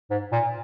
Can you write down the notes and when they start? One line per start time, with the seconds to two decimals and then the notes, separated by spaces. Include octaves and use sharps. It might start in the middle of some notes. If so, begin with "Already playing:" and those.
0.10 G#2
0.32 A#2